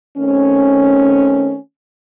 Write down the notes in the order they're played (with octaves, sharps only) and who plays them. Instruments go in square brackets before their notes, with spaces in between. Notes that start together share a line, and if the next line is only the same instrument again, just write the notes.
[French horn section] D#3 A3 C4 C#4